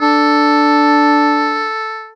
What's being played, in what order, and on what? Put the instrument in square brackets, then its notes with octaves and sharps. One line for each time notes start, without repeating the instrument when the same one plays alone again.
[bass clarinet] D4 [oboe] A4